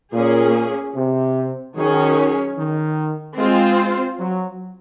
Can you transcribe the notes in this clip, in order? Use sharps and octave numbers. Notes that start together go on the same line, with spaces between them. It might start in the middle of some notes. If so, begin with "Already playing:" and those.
A#2 A#3 C#4 G#4
C3
D#3 F#3 C#4 G#4 C#5
D#3
G#3 C4 F4 C5
F#3